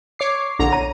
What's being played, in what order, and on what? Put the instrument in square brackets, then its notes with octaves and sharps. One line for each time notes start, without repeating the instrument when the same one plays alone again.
[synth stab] C#5 D6 C7
[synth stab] A#1 A#5 [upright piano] D3
[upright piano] C#5 A#5 [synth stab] D#7